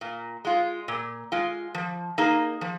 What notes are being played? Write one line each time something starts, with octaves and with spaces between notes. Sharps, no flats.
A#2
G#3 F4
A#2
G#3 F4
F3
A#3 D#4 G#4
F3